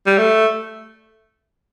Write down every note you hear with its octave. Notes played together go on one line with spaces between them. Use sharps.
G3
A3